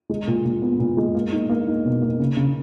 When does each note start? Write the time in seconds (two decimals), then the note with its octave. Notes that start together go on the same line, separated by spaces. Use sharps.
0.09 G#3
0.27 A#2
0.45 A#2
0.62 B3
0.79 A#2
0.97 G#3
1.15 A#3
1.32 D#4
1.49 A#3
1.67 D#4
1.85 B2
2.02 A#3
2.20 C#3
2.37 C#3